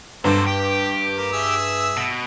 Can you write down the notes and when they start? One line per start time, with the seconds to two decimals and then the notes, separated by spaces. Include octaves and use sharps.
0.24 G2 F#3 C4 A4 C5
0.46 G4 G5
1.17 A#3
1.33 G#4 E5 E6
1.97 B2